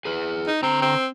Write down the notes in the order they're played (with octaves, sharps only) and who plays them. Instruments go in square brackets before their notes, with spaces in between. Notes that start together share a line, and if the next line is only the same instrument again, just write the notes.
[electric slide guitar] G#4 B4
[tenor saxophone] D#4
[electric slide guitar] D3 A#5 [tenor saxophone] C4
[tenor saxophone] C4